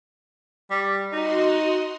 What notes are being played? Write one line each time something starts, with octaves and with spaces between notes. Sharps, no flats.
G3
D#4 F#4 D#5 C6